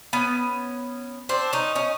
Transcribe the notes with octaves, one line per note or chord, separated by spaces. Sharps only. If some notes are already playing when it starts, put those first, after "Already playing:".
B3 C#4
C4 D4
C#4 D#4
C#4 D#4